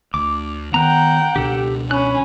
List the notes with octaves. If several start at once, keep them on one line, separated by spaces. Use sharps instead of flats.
D2 D6
D#3 B3 F#5 G5 A#5 F#6
C#2 B2 D3 G4 A4
C#4 B5 F#6